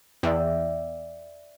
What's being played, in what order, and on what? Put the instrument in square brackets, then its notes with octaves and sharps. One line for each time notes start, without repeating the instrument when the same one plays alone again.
[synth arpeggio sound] E2 [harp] D5 E5 G5